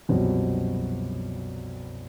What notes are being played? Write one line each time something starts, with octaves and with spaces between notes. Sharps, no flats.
C2 F#2 B2 F3 F#3 C4